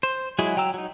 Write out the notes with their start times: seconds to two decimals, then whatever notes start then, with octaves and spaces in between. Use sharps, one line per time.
0.03 C5
0.39 F#3 G#3 E4 F#4 G#4
0.57 F#3 G5 A#5 E6
0.74 F#3 D#4